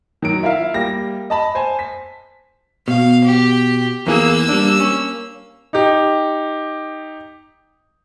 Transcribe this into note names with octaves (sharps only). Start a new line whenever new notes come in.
D#3 F#3 D7
E4 F4 A#4 E5 F5
G3 A#3 G4 A#6
D#5 A5 B5
C5 G#5 A5
B6
B2 F5
G4
E2 E3 A#3 G#4 E6
G3 D4
C#4
D#4 G4